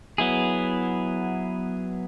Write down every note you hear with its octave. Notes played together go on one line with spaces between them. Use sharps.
F#3 B3 E4 G#4